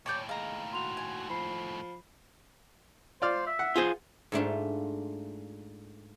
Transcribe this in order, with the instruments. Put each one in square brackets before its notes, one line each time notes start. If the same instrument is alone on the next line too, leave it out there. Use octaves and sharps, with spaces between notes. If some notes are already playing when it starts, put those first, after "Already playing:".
[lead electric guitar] D#2 A2 [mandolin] C#5 D5 G5
[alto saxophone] G#3 [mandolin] F5 A#5
[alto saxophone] F#4 [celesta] C6 F7
[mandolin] G#5
[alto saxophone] F3 [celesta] B5 C7
[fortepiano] F4 D5 F6 [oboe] C5
[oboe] E5
[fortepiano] F#5
[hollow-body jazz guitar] F4 G#4 C5
[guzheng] G#2 A3 D4 F4